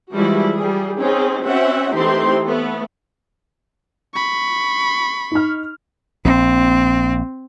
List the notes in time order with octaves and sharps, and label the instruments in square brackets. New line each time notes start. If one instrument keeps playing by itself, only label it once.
[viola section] E3 F3 G3 G#3 E4 F#4
G3 G#4
C4 C#4 D#4 G#4
C4 C#4 F#4 E5 F#5
E3 A3 C4 D#4 G4 C6
A3 B3
[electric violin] B5 C#6
[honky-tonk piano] D#4 F6
[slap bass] A#1 [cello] C4